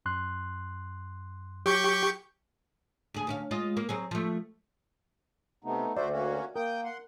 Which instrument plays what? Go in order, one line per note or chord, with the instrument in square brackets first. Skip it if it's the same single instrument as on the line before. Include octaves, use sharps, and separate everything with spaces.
[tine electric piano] F#2 C6 F#6
[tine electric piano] F#3 [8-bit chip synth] G4 C#6 G6
[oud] D2 G#4
D2 C#4 F5
G#3 F4 D#5
A#3
F#3 C4 G#4
F3 A3
[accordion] C3 [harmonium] A3 B3 D#4
[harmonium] D2 [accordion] A3 F#4 C5 [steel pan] D5 E5
[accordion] A#3 C#4 F#4
[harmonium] A#3 [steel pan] A#4 [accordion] G5 D#6 G6
[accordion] F#5 C6